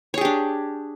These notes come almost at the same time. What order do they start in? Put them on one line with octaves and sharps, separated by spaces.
C#5 G#4 G4 D4